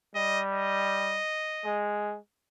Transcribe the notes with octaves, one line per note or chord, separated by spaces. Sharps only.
G3 D#5
D#5
G#3